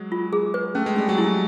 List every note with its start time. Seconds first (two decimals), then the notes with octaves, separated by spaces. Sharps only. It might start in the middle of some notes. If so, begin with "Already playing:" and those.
Already playing: F#3 G#3
0.12 F4
0.33 G#4
0.54 B4
0.75 A3 C#4
0.86 G#3
0.96 G3 C#4
1.09 F#3 G#3
1.18 E4